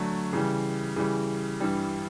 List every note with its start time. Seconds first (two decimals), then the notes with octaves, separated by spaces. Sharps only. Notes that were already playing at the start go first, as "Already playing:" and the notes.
Already playing: D3 F#3 A3 D4
0.33 C#3 E3 G3
0.96 C#3 E3 G3
1.60 G2 E3 G3